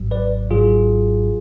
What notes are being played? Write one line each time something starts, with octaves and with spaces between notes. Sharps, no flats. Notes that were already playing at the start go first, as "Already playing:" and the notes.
Already playing: G#1 G#2 F#3
B4 D5
G#1 G#2 F#3 F4 G#4